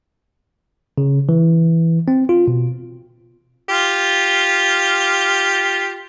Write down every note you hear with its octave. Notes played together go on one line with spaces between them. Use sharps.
C#3
E3
C4
F4
B2
F4 G4